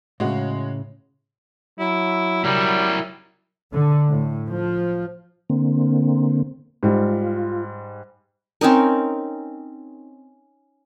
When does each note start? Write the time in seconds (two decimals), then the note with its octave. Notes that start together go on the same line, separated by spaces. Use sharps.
0.20 A2 C#3 G#3 F#4
1.79 F#3 E4
2.44 G3 E4 A#4
3.73 D3
4.10 A2
4.49 F3
5.50 D3 A#3 C4
6.83 G#2 G3 F4
8.61 C4 C#4 D#4 A#4